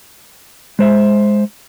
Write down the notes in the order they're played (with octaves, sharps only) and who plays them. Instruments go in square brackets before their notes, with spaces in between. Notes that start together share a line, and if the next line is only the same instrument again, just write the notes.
[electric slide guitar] G#3 C5 E5